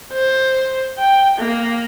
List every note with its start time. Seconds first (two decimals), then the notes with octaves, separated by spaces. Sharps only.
0.14 C5
0.99 G5
1.39 A#3